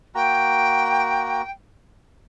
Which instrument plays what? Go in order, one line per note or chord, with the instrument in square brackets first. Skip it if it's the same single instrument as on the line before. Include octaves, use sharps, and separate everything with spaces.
[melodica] A#3 F#4 A#5 [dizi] G5